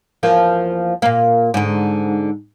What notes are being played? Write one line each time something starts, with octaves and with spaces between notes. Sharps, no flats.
E2 F3 A#3
A#2 A#3
G#2 D3